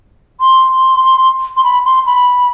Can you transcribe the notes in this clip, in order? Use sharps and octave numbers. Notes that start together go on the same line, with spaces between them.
C6
C6
B5
C6
B5